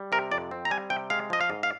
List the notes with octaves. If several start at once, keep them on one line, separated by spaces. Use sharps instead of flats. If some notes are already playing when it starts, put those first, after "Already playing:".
Already playing: G3
C3 A#4
F2 D5
C4
A#5
G3 G#5
C3 G5
G#3 F5
F3 D#5
F5
G#2
F5